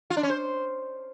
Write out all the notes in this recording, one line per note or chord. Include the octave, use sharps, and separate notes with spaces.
F4
D4
C#4
C5